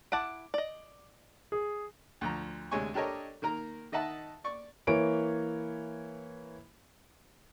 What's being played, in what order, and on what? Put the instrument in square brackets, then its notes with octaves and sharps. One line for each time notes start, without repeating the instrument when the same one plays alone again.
[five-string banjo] E4 F#5 A5 [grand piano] D6 D7
[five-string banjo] D5 D#5
[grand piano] G#4
[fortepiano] D2 F3 A#5
D2 C3 G#3 C#5 G#5 C#6
D4 G4 A4 A#4 C#5 D#5
D#3 A#3 A#4 A#5
D#3 D#5 E5 F#5 A5
D5 C#6
[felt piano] E3 A#3 C#5 D7